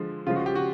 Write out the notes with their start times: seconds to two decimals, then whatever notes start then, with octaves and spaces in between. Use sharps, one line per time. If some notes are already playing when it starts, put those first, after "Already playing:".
Already playing: D3 F3 G#3
0.27 C#3 F3 G#3 F4
0.36 F#4
0.46 G4
0.55 F#4